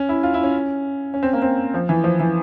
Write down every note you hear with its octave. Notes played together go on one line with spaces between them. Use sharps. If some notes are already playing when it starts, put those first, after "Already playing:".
Already playing: C#4
E4
F4
E4
C#4
C#4
C4
A#3
C4
F3
E3
F3
E3